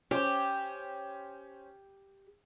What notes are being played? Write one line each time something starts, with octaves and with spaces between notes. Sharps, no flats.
C#4 G4 C5